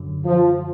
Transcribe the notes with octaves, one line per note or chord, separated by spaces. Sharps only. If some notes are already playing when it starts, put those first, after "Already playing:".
Already playing: F#2 D3 F#3
F3